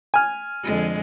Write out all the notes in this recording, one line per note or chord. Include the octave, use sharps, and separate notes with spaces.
G#5 F6
F2 D3 G#3